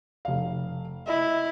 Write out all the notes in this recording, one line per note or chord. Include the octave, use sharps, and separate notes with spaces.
F1 F5
E4 D#5